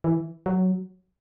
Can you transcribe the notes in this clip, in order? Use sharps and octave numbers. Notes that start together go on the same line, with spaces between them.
E3
F#3